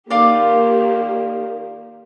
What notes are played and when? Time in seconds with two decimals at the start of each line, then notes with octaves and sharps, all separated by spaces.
0.10 D#3 A#3 F4 G4 D5